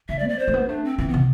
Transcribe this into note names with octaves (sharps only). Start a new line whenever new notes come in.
D3 E5
D5
C4
D5
C5
A3
B3
A3 D4
C4
E3 C4
B3
C3